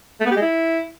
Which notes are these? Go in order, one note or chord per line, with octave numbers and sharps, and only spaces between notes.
A3
B3
G4
G#3
E4